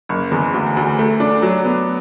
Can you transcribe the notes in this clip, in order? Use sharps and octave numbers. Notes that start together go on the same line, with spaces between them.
F#1
E2
D2
D2
A3
D4
F#3
B3